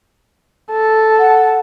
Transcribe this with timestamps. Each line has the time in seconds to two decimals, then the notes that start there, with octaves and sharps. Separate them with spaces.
0.71 A4
1.19 F#5